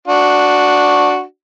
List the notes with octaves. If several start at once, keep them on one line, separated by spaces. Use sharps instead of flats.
D4 F#4